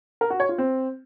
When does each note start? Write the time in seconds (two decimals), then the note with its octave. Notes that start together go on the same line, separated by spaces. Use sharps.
0.21 A#4
0.30 F#4
0.40 C#5
0.49 F4
0.58 C4